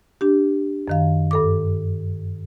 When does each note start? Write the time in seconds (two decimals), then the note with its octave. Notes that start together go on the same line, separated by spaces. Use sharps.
0.21 D4 G4
0.88 F#2 D#3 F5
1.31 G2 A4 D6